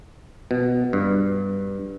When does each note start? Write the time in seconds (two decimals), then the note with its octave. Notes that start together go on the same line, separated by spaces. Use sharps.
0.51 B2
0.93 G2